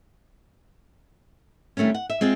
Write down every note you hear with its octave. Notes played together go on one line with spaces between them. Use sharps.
D#3 G3 A3 C4 C#4
F#5
E5
G#3 C4 F4 G#4